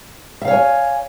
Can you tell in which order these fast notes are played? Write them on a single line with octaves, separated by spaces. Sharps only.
E5 F5 C#5 G#5